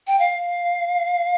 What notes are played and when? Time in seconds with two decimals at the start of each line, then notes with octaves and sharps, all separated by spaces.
0.07 G5
0.19 F5